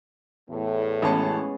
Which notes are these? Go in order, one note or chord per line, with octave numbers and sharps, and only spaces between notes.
E2 A2
A1 G#3 B3 C#4 A5